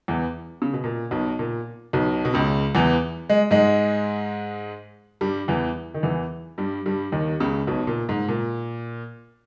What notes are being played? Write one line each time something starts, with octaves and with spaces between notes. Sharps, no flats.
E2 E3
C#3
B2
A#2
B1 B2
A#2
B1 B2
B2
C#2 C#3
E2 E3
G#3
G#2 G#3
G2 G3
E2 E3
D#3
E2 E3
G2 G3
G2 G3
D#2 D#3
C#2 C#3
B1 B2
A#2
G#2
A#2